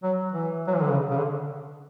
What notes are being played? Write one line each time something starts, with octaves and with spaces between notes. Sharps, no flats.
F#3
E3
F#3
E3
D3
C#3
C#3
D3